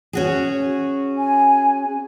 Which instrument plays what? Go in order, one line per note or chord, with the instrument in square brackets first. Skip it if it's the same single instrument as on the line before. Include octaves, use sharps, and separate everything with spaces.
[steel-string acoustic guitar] C#4 F#4 G#4
[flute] G#5